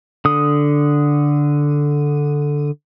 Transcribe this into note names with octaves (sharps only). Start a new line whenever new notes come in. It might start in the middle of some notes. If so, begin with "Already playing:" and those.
D3 D#6